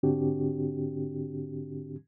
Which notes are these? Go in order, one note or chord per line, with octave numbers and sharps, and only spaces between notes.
G#2 D3 C4 D4 F#4 G4